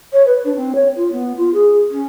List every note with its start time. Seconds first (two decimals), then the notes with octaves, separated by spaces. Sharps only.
0.12 C#5
0.26 B4
0.44 D4
0.56 C4
0.75 C#5
0.96 F4
1.12 B3
1.37 F4
1.54 G#4
1.91 C#4